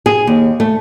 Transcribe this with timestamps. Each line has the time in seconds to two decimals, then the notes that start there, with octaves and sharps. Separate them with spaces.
0.06 G#4
0.27 D#2
0.60 A3